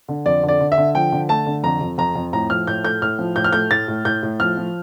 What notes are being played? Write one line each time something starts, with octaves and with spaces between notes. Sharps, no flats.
D3
F2 D5
D3
D5
D3
E5
D3
F3 G5
D3
A3 A5
D3
F2 A#5
F2
F2 A#5
F2
A2 A#5
F3 F6
A2 G6
A3 G6
A2 F6
F3
A2 G6
F6
A3 G6
A2 A6
A2
A2 G6
A2
F3 F6
F3